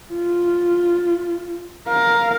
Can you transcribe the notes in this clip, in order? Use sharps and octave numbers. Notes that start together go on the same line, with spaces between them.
F4
A#4 F5